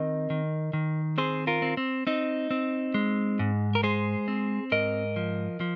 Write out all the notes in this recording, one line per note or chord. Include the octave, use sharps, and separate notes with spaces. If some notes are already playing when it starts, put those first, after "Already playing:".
Already playing: D#3 C4 A#4 D#5
D#3
D#3
C4 G#4 C5
F4 A#4
C4
C4
C4 D#4
C4
G#3
G#2
A#4
G#3 G#4 C5
C4
G#2 A#4 D#5
F3
F3